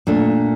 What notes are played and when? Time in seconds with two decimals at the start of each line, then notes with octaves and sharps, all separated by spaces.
0.07 A#2 A3 D4